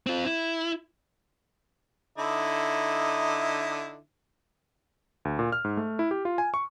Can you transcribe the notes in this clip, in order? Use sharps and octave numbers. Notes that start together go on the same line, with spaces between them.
C4 F4
E4
D3 D#4 E4
D2
A#2
F6
G#2
A3
E4
G4
F4
G#5
C#6